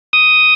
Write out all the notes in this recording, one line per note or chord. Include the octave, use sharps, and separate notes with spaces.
D#6